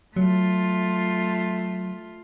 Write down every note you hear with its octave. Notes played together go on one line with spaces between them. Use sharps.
F#3 A3 F4